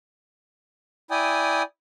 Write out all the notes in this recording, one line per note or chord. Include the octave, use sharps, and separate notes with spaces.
E4 D5 G5 G#5 D#6